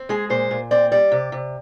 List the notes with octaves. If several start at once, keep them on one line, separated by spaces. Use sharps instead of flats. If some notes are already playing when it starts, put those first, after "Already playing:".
Already playing: C4
G#3 G#4
A#2 C5
A#2
C4 D5
G3 D5
C3
C3